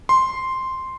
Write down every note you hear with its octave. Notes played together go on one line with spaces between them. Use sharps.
C6